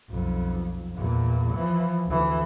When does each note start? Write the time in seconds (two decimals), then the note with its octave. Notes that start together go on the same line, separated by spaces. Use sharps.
0.10 B1 F2
0.96 E2 A#2
1.54 E3 F3
2.06 D2 E3